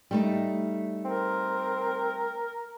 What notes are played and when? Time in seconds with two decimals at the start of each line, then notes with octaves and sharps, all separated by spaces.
0.11 G3 A3 D#4
1.05 C4 A#4